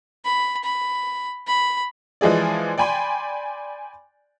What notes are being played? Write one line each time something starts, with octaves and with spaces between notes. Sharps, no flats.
B5
B5
B5
E3 F3 G#3 G#4 D5
D5 G5 G#5 B5 C6